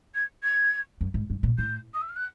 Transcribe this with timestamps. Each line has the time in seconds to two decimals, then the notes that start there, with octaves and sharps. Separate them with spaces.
0.14 G#6
0.43 G#6
1.01 F#2
1.14 G#2
1.30 G2
1.43 A#2
1.58 A2 G6
1.93 D#6
2.01 E6
2.08 F6
2.16 F#6